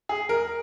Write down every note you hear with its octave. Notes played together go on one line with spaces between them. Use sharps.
G#4
A#4